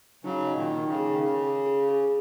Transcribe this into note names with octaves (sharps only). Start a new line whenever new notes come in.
C#3 F#3 D#4
D#5
A#2 D#3
D#4
C#3
G#4
D#3
C#3 G#4
G#4
G#4
G#4